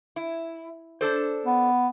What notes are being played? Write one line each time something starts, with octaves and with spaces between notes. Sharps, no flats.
E4
D4 A4 C5
B3